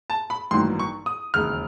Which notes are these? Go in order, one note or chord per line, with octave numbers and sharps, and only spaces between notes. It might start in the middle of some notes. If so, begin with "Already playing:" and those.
A5
B5
A1 G2 D#3 F#3 A#3 C6
C#6
D#6
E1 D#2 C#3 F6